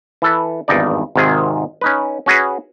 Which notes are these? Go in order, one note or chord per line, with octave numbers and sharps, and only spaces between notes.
E3 A4 B4
G#1 E2 G2 D#4 D5
G#1 G#2 C3 D#3 G#4
C#4 D#4 B4
C#4 F#4 G#4 B4